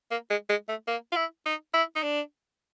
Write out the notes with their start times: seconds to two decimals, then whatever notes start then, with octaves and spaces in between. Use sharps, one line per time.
0.11 A#3
0.30 G#3
0.49 G#3
0.69 A3
0.87 A#3
1.12 F4
1.16 E4
1.46 D#4
1.74 E4
1.96 D#4
2.03 D4